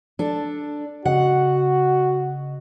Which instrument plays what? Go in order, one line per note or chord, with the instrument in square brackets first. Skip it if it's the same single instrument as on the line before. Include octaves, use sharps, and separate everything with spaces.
[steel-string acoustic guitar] D4 A4
[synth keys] C#3 D#5 [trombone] F#4 [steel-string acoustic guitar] F#5